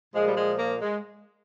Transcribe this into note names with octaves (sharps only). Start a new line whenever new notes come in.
A#2 F3 G#3
G3
G#3
A#3
G#3